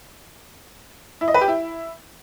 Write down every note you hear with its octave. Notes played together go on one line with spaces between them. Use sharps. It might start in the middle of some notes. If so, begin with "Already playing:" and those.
E4
D#5
B4
G4
E4